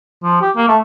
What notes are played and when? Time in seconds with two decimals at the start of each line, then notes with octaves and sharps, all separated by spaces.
0.24 F3
0.41 G4
0.56 A#3
0.68 A3